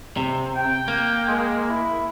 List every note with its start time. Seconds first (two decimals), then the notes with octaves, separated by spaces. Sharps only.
0.17 C3
0.55 G5
0.88 A#3
1.28 G#3
1.69 E4